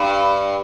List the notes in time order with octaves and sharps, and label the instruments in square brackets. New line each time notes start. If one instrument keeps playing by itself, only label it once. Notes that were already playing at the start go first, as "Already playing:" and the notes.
Already playing: [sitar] G2